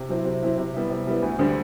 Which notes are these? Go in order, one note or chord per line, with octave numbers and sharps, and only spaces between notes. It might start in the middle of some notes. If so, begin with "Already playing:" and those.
Already playing: C3
F#3 C4 E4
C3
F#3 C4 E4
C3
G3 B3 E4
C3
G3 B3 E4
D2
D3 G3 C4